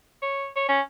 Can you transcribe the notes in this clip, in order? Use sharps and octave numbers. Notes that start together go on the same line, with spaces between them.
C#5
C#5
C#4